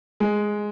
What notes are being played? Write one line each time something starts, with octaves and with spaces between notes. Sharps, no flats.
G#3